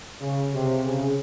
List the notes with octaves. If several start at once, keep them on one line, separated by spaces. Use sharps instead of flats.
C#3
C3
C#3